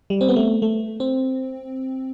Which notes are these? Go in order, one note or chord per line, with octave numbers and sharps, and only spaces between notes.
G3
C4
B3
A3
A3
C4